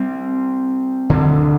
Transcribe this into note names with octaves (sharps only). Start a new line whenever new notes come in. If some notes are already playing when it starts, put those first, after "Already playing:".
Already playing: G3 C4
D2 D3